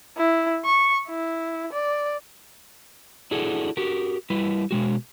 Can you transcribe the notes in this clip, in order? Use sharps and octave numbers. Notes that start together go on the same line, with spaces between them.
E4
C#6
E4
D5
D4 E4 F#4 G#4 A4
F#4 G4 A#4
G3 E4 B4
B2 G#3 F#4